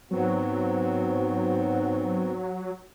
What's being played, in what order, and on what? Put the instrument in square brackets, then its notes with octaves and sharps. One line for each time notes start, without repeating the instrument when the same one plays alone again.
[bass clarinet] G#2 [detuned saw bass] F#3 [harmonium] B3 C4 F#4